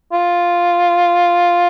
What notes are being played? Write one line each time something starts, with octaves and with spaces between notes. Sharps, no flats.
F4